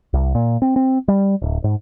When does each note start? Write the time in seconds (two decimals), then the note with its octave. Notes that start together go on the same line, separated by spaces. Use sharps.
0.13 C2
0.35 A#2
0.62 C4
0.76 C4
1.08 G3
1.42 D1
1.64 G#2